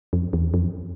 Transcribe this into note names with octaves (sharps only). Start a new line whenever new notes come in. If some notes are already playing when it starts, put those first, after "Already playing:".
F2
E2
F2